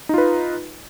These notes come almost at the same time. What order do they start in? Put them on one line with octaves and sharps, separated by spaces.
D#4 F4 B4